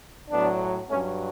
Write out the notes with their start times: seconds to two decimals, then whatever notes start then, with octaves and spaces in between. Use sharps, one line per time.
0.30 A2 F#3 B3 D4
0.89 G2 A3 C#4
0.94 F#3